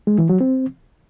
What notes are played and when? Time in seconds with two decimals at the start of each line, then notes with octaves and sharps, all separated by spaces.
0.07 G#3
0.18 E3
0.29 F#3
0.41 C4